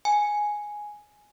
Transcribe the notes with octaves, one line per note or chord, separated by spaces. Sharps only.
G#5